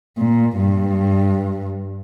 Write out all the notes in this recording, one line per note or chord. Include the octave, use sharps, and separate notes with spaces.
A#2
G2